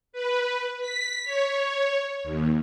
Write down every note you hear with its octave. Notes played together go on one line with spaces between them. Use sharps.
B4
B6
C#5
D#2